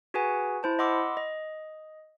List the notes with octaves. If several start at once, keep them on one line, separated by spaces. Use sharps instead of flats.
F#4 G#4 B4 F#5 G#5
E4 C5 A5
D#5 F#5 B5 C6 D6 E6
D#5